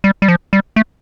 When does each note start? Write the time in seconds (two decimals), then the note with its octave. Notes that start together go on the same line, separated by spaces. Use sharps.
0.04 G3
0.22 G3
0.28 F3
0.53 G3
0.76 A3